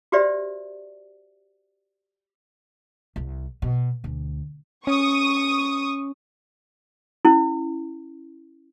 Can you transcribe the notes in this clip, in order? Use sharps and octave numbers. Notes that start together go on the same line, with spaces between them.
F#4 G4 B4 C5 D5 E5
C2
B2
D2
C#4 C#6 D#6
C#4 E4